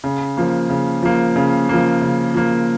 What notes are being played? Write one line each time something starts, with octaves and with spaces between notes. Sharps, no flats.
C#3
F3 A#3
C#3
F3 A#3
C#3
F3 A#3
C#3
F3 A#3